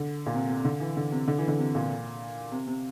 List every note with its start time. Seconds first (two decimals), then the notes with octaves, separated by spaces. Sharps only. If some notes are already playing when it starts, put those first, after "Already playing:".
Already playing: D3
0.26 A#2
0.34 C3
0.49 C3
0.65 D3
0.80 E3
0.97 D3
1.12 C3
1.28 D3
1.38 E3
1.48 D3
1.58 C3
1.75 A#2
2.52 C3
2.67 C3